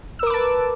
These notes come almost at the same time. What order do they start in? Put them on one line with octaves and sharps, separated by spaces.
E6 A#4 D6 B4 A5